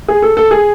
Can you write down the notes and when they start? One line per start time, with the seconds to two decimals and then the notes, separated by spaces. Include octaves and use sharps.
0.08 G#4
0.22 A4
0.37 A4
0.51 G#4